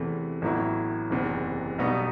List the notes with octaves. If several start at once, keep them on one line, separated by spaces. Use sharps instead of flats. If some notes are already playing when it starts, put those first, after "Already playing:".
Already playing: E2 C3 E3 A3
A1 A2 F#3 B3 E4
F#1 E2 C3 E3
B1 B2 G3 B3 D#4